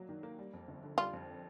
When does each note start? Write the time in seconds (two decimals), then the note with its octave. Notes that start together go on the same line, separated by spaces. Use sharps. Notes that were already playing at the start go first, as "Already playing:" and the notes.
Already playing: F#3 A#3 D4
0.09 D#3
0.23 A#3
0.39 G3
0.53 F2
0.68 G1
0.83 D3
0.98 G3 F4
1.13 F2